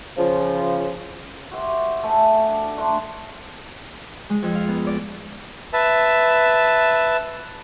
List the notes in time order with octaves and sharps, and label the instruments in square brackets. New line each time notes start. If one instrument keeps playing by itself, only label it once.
[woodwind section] C#3 F3
[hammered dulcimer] F#4 G4 C5 E5
A3 A4 E5 G#5
D4
A3 D4 A#5 C6
[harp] G#3
F2
F5
B3
D5
[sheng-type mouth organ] B4 E5 A5